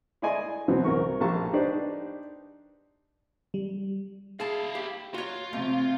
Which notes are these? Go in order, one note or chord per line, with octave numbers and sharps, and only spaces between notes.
E4 D5 D#5 G#5 C6
B2 E3 F#3 B3 C4
C2 A#4 C#6
A#1 A#3 F4 G4 A5 C#6
D4 D#4 G4 B4 C5 D5
G3
E4 G#4 F5 A5
G4
F4 F#4 C#5
C3 A3